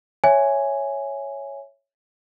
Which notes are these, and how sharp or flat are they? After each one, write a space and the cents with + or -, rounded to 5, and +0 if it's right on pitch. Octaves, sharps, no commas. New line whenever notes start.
C#5 +0 E5 +5 G#5 +0